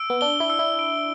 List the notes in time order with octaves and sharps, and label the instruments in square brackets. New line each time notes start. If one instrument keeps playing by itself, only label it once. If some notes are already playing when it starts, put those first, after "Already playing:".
Already playing: [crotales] E6 D7
[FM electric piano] B3
[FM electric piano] D4 [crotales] G7
[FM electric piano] E4
[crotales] E6
[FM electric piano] E4
[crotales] D7